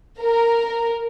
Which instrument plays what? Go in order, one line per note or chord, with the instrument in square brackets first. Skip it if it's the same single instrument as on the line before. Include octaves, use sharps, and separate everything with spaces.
[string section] A#4